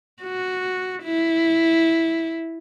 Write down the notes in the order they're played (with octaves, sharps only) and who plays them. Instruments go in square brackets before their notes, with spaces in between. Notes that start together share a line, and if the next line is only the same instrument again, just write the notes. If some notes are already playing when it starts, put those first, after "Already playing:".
[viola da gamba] F#4
E4